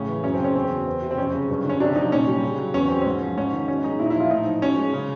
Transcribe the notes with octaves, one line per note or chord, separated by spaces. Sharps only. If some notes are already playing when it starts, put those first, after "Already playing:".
Already playing: A2 C#3 C#4
E3
F#2 C#4
C4
C#3
C#4
E2 C4
B2
E2
C3
C4
F2 C#4
C#3
G2
D3 C#4
C3 D4
F3 D#4
A#2 C#4
G3
C#3
F#3
E2 C#4
B2 C4
G#2 C#4
F3
G#2 C#4
D#3
B2 C#4
G#3 D#4
A#2 E4
D#4
E4
F3 F4
A2 D#4
F3
B2 C#4
G#3
C#3